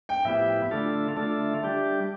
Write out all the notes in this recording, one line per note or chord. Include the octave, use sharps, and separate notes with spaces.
G5
A2 F3 B3 E4 G4 E5
D3 A3 D4 F4 A4
D3 A3 D4 F4 A4
G3 D4 G4